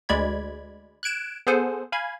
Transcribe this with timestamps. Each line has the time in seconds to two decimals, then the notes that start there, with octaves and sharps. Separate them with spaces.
0.09 D2 G#3 D5 B5 G#6
1.03 F#6 G#6 D7 E7
1.47 B3 G#4 A4 C5 F#5 G#5
1.92 F5 G#5 B5 G#6